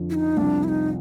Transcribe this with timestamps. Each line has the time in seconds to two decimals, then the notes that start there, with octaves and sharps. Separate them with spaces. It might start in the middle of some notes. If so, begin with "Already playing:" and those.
Already playing: F2 D3 F3
0.10 E4
0.14 D#4
0.37 C2 C3 F3 D4
0.64 E4
0.69 D#4